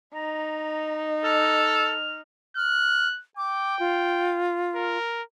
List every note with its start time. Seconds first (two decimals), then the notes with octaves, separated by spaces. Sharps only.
0.14 D#4 A#5
1.24 A4 F6
2.56 F6 F#6
3.37 G5 D6
3.79 F4
4.75 A#4